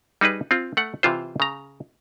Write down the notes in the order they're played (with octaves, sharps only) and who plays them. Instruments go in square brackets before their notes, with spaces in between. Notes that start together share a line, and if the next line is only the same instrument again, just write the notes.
[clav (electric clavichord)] G3 D#4 G#4 B4
C4 F4
A3 F#5
C3 E3 F4 C5
C#3 A#5